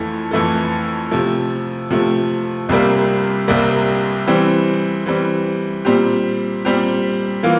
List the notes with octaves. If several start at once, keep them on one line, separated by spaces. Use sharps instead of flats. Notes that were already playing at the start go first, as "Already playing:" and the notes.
Already playing: F2 E3 A3 E4 A4
F2 E3 A3 E4 A4
C3 F3 A3
C3 F3 A3
C2 C3 G3 A#3
C2 C3 G3 A#3
E3 G3 C4
E3 G3 C4
A#2 G3 C4 G4
A#2 G3 C4 G4
E3 A#3 F4